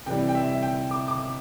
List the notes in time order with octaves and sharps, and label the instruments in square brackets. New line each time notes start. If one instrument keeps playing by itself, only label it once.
[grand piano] C3 E3 G3 G5
G5
E5
G5
D6
D6